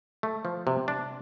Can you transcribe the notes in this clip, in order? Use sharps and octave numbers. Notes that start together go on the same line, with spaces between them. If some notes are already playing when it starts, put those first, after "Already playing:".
A3
F3
C3
D4